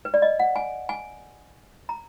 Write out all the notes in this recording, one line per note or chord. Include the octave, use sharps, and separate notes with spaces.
B4
D5
D#5
F#5
G#5
G#5
A#5